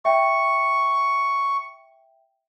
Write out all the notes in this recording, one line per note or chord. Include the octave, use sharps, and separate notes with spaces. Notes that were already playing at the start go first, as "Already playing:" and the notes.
E5 G5 C#6